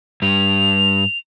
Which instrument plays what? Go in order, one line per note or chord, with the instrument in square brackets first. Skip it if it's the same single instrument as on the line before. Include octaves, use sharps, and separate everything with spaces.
[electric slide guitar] G2 G3 [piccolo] F7